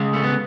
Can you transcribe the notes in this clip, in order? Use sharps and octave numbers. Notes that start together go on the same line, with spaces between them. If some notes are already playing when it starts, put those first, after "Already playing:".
Already playing: C#3 G#3
A3
B3